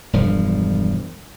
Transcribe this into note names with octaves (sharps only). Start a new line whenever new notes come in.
E1 G2 F3